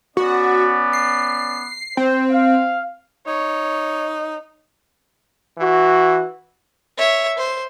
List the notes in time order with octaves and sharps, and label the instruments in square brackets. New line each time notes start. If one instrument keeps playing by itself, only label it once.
[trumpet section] B3 C#4 D5 [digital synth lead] F#4
[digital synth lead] C7
[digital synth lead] C4 [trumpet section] C5
[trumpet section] F5
[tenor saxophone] D#4 [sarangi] C#5
[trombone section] E3 F#4
[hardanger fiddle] C#5 E5
C5